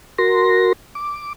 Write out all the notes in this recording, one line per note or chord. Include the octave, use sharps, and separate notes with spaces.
F#4 A#4 C6 A#6
D6